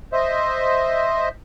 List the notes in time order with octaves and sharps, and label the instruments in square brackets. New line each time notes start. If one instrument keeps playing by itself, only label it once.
[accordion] C5 D#5 E5